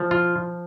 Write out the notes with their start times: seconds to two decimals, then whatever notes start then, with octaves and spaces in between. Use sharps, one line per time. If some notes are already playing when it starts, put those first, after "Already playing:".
Already playing: F3
0.11 F4